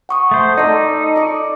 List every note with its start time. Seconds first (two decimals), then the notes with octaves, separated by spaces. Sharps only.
0.09 F#5 C#6 D#6
0.31 A3 C5
0.57 D#4 A4 D5 D#5
1.16 D5 C#6